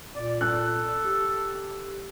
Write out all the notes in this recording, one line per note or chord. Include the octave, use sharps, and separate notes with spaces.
A#2 D5
A4 F#6
G4